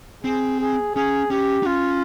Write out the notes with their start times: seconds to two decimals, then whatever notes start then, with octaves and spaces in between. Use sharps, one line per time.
0.24 C4 G#4
0.61 G#4
0.95 C#4 G#4
1.30 C#4 G4
1.63 D#4
1.66 C#4 F4